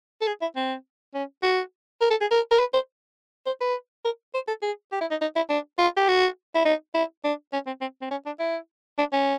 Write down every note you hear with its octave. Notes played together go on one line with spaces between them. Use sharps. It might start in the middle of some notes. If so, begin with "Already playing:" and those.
A4
G#4
E4
C4
C#4
F#4
A#4
A4
G#4
A#4
A#4
B4
C5
C5
B4
A#4
C5
A4
G#4
G4
E4
D#4
D#4
E4
D4
F4
G4
F#4
E4
D#4
E4
D4
C#4
C4
C4
C4
C#4
D4
E4
D4
C#4